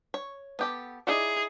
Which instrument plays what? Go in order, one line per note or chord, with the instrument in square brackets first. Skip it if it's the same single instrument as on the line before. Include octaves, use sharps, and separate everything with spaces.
[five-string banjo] C#5
B3 G4 A4
[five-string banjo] D#4 E4 D5 [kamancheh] G#4